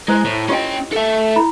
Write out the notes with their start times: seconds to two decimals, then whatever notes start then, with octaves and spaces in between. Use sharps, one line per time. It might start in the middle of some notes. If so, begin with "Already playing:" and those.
0.08 G#3 E4 C5
0.25 A2
0.49 C#4 F4 G4 D#5 G5
0.92 A4 E5
1.36 E4 B5